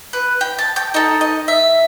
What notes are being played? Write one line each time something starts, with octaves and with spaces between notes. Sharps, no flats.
B4
G5
A5
G5
D#4 A4 D#5
D#5
E5